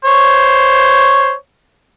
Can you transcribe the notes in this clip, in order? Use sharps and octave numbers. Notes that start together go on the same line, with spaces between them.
C5 C#5